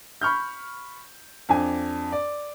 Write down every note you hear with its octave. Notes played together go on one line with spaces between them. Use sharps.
B5 C#6 F6 G6
F2 D4 G#5
D5